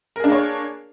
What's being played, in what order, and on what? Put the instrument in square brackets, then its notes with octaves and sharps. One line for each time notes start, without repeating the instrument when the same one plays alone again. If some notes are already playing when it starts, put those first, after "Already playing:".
[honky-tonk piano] A#4
G#4
D4
A#3
C#5